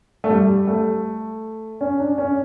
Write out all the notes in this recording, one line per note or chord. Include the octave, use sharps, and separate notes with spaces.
A3
G3
A3
C#4
D4
C#4